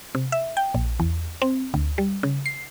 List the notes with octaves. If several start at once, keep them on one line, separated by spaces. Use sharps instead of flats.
C3
E5
G5
A#1
E2
C4
D2
G3
C#3
C7